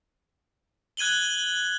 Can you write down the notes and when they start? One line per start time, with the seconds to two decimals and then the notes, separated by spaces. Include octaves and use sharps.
0.97 F#6 G#6 D#7 F#7 G7